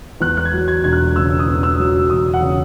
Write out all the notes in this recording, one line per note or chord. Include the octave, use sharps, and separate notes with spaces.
E2 F#6
F#6
G#6
F#3
G#6
E1 G#6
F#6
C#3 E6
D#6
E2
E6
F#3
E1 D#6
F#5
C#3